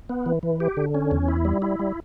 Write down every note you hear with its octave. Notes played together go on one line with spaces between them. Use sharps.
B3
E3
E3
G4
D3
C#4
E2
E4
G3
E4
G3